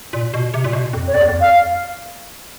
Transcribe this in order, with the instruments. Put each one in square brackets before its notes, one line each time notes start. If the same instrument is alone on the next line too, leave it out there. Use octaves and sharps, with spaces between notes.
[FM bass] A#2
B2
C3
A#2
B2
F2
[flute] C#5
[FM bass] F2 [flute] D5
[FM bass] E2
F2
[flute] F5